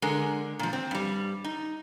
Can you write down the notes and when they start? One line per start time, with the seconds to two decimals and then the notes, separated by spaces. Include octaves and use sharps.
0.02 D3 G#3 A#4
0.59 A#2 F3
0.73 C4
0.91 G2 G3
1.44 D#4